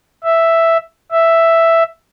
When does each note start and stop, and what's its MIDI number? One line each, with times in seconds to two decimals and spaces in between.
0.24 0.77 76
1.11 1.83 76